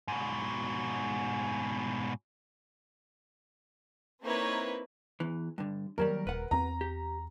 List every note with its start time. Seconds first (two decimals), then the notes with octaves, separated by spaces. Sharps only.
0.08 G#2 B2
4.23 A#3 C4 D#4 E4 B4 C#5
5.20 E2 E3
5.58 G2 D3
5.98 D#2 F#3 G3 A#4
6.27 D#1 B4 F#5
6.51 E2 C4 A#5
6.81 G4